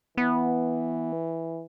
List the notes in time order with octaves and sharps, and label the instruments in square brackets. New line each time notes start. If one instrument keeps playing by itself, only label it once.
[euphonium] E3 [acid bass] B3